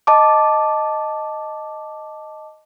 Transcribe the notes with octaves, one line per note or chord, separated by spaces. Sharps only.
D#5 A5 D6